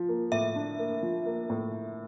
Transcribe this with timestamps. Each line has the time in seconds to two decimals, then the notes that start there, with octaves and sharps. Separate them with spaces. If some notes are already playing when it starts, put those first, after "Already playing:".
Already playing: F3
0.09 A#3
0.32 A2 E5
0.56 D4
0.79 A#3
1.03 F3
1.26 A#3
1.50 A2